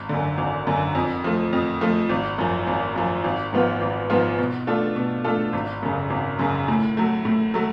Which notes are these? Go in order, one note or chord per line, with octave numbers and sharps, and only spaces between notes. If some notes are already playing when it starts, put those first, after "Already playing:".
Already playing: G#1
F#2 D3
G#1
F#2 D3
F2
F3 A3
F2
F3 A3
G#1
F#2 F3
G#1
F#2 F3
G#1
G#2 F3 B3 F4
G#1
G#2 F3 B3 F4
B2
A3 D4 F4 A4
B2
A3 D4 F4 A4
G#1
F#2 C#3
G#1
F#2 C#3
A2
F#3 A3
A2
F#3 A3